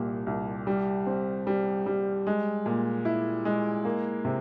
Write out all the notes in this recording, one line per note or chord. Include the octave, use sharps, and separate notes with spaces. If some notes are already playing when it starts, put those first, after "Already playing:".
Already playing: C2 A#2 G3
C2
G3
C4
G3
G3
G#3
A#2
E4
G#3
A#3
C3